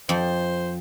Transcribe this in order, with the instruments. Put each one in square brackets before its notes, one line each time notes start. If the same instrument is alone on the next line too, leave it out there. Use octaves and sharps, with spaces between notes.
[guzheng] F2 [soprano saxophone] C5